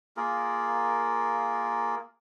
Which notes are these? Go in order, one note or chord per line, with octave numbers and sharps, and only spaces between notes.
A#3 F4 G#4 A#4